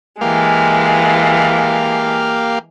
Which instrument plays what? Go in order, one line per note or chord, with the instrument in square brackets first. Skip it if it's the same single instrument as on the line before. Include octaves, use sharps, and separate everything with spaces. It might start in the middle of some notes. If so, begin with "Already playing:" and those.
[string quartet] E3 G#3 [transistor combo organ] A#3 G4 F5